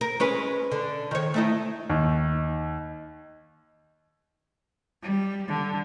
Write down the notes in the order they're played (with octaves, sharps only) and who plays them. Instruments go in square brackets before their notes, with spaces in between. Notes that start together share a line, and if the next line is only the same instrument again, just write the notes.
[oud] A#4
G#3 C#4 B4
D3
D#3 C#5
A3 D#4 E4
[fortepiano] D#2
[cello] G3
D3